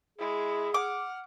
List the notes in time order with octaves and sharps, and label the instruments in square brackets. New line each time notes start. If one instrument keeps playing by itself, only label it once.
[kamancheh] G#3 E4 [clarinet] G#4
[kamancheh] F#5 F6 [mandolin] D6